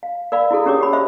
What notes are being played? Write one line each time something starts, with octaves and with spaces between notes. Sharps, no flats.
F5
A#4 D5 F5 B5
E4 F#4 G#4 A4
C#4 G4 A#4 C#5 D6 D#6
G4 B5
C5 E5 B5